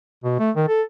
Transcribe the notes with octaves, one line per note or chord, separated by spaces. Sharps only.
B2
A3
D#3
A4